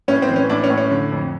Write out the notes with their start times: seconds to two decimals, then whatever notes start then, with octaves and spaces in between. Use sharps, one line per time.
0.08 A2 C#4
0.22 C4
0.29 E3
0.36 C#4
0.49 A2 D4
0.64 C#4
0.70 A2
0.78 C#4
0.91 D3
1.11 F2